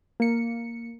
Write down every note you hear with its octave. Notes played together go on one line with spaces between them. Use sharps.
A#3 C#7